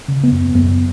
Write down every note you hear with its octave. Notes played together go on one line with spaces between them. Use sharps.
C#3
B3
F#2
F#2 B3